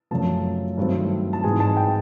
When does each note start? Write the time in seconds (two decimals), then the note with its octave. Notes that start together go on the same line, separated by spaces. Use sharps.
0.11 F#2 C#3 F3 A3 A5
0.78 G2 D#3 F#3 A3 C4
1.33 A5
1.44 G#2 E3 G#3 G#5
1.60 A5
1.77 G5